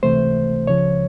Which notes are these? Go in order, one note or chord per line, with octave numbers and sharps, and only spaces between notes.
C#2 C3 E3 A3 C5
C#2 C#3 F3 C#5